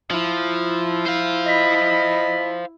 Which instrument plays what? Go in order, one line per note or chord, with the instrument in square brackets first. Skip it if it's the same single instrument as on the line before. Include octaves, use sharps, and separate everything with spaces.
[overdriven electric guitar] F3 [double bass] E4
[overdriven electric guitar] C5 F5
[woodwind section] D#5 B5